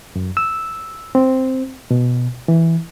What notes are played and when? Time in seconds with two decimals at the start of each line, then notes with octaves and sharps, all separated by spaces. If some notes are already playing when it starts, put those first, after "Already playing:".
0.16 F#2
0.37 E6
1.15 C4
1.91 B2
2.48 E3